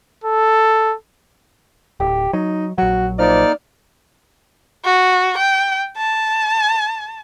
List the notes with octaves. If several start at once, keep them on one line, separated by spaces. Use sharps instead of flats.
A4
D1 G4
F#3 D#4
A#1 F#3 F#4
F3 A#3 D#4 D5 F6
F#4
G5
A5